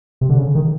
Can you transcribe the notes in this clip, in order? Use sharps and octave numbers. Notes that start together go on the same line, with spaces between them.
C3
D3
C#3
D#3